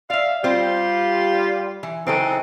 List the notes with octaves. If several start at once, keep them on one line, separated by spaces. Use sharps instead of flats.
D5 E5 F5
G3 C4 F4 G4 C5
E3
C#3 E3 F#3 C4 D#4 A4